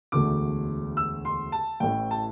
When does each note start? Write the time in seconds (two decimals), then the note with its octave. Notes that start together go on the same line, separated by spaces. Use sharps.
0.12 E1 D2 D3 A3 D6
0.97 E6
1.25 C6
1.52 A5
1.80 A1 A2 E3 G5
2.11 A5